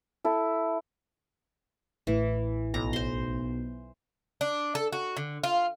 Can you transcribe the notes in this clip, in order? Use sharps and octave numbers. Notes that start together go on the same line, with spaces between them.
E4 A4
A1 A2 E3
B1 A#5
C5 C6
D4
A4
F#4
D3
F4